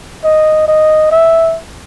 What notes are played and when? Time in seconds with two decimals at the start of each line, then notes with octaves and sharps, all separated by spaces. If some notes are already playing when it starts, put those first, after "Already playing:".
0.24 D#5
0.68 D#5
1.11 E5